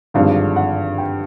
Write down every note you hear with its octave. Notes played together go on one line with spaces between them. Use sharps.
G#1 G2 D3 F3 G#3 F5
F#5
G5